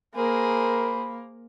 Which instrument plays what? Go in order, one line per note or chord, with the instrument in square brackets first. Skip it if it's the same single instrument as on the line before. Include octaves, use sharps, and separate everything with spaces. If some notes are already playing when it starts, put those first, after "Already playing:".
[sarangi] A#3 [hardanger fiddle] G#4 C5 [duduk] A#4 [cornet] B5